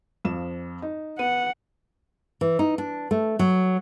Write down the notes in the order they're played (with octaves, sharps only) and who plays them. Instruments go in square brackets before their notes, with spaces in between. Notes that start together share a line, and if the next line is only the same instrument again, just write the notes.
[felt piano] F2 F3 E7
D#4
[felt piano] B3 D#7 [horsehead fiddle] F#5
[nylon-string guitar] E3
D#4
D4
A3
F#3